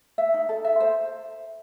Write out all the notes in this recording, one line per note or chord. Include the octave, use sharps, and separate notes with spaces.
E5
D#4
A4
E5
C5